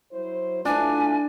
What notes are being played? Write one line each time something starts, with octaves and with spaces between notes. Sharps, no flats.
F#3 E4 C5
A3 D4 E4 F4 G#5